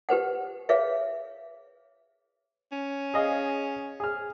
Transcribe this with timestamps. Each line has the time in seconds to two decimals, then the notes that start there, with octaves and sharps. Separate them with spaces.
0.09 G4 B4 C5 F#5
0.69 G#4 B4 C#5 E5 F5
2.72 C#4
3.14 G#4 D#5 F5
4.00 G#4 F6